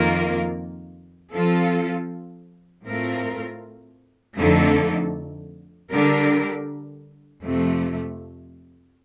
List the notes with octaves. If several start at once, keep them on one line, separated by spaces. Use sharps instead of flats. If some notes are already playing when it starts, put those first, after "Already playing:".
Already playing: F2 D#3 A#3 F4 A#4
F3 C4 F4 A4
A2 A3 C4 F4 A#4
F2 D3 A3 D#4 A4
D3 G3 D4 G4 A#4
F2 C3 F3 A3